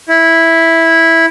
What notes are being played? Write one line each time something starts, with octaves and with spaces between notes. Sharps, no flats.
E4